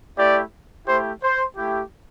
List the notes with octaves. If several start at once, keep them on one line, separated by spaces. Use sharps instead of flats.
A3 E4 G4 D5
A3 E4 G4 C5
C5
A3 E4 G4